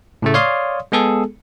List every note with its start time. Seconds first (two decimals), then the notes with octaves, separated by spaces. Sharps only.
0.22 A2 C#3 A3
0.34 C#5 D5 F5 C6 D#6
0.92 G#3 B3 G#4 A4